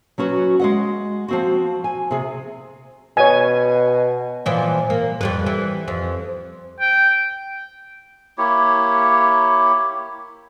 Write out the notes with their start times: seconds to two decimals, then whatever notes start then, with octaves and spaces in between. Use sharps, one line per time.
0.18 F#3 C#4 F#4 B4
0.60 G#3 D#5 F#5
1.28 F3 C4 F#4
1.84 G#5
2.11 C3 G#4
3.17 B2 C#5 G#5
4.46 A#2 E3 F3
4.90 A#3
5.21 F2 G3 B4
5.46 E3
5.88 F2
6.81 G5
8.38 A#3 E4 G4 C#5